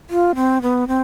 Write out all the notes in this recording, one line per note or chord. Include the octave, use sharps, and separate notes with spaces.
F4
C4
B3
C4